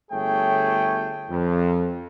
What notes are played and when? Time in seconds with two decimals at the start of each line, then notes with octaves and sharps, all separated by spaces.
0.12 G1 A3 G#4 C#5 G5
1.30 F2